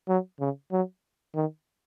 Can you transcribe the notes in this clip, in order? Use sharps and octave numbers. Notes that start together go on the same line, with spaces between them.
F#3
C#3
F#3
D#3